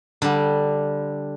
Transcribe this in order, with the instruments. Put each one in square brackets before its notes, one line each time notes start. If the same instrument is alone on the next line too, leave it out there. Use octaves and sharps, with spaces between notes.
[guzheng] D3 G3